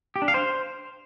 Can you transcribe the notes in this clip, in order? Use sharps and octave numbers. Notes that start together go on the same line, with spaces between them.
G4
D4
F5
C5